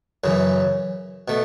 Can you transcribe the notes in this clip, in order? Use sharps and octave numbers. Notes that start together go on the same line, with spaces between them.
F#2 C#3 E3
B2 A3